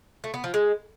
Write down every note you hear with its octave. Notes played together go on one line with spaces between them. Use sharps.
A3
B3
F3
G#3